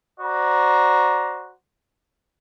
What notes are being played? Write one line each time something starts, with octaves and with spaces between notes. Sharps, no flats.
F#4 C5 D5 A#5